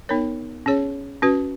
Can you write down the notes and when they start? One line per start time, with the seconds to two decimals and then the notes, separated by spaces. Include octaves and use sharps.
0.09 B3 D#4 A#4 C#5
0.66 C#4 G#4 C#5
1.22 C#4 F#4 B4